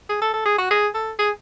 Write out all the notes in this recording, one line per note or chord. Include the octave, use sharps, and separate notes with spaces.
G#4
A4
A4
G#4
F#4
G#4
A4
G#4